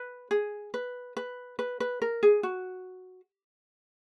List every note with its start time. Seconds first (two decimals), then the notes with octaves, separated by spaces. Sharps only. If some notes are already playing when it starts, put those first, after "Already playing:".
Already playing: B4
0.31 G#4
0.74 B4
1.17 B4
1.59 B4
1.80 B4
2.02 A#4
2.23 G#4
2.43 F#4